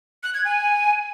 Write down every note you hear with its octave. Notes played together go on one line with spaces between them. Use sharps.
F#6
G#6
G#5